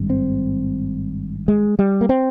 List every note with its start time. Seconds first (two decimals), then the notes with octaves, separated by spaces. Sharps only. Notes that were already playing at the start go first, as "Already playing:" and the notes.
Already playing: G#1 G2
0.10 C4
1.48 G#3
1.79 G3
2.01 A#3
2.09 C4